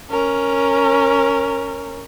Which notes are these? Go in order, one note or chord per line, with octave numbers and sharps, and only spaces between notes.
C#4 A#4